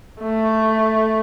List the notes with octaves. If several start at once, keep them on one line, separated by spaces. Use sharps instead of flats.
A3